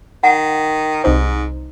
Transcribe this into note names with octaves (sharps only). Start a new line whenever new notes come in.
D#3 F#5
C2 G#2 D#4 C5